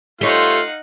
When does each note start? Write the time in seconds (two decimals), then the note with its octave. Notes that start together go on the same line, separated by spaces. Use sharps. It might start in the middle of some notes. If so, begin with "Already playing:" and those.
0.21 A3 D#4 F4 G4 C5 C#5 F5 F#5